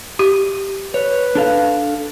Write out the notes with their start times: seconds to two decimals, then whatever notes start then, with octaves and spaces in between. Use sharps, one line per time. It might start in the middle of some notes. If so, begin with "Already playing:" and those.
0.19 G4
0.94 B4 C#5
1.35 D4 A4 F5